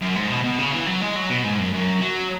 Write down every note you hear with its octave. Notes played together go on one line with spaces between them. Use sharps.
F#2
G#2
B2
B2
C#3
E3
F#3
G#3
F#3
B2
G#2
F#2
F#2
F#3